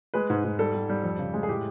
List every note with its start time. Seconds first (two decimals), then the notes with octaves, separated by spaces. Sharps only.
0.14 G#3 B4
0.30 G#2
0.44 G#2
0.59 G3 A4
0.74 G3
0.89 G3
1.04 F2
1.19 C#3
1.34 G#3
1.43 G#4
1.49 A2 G4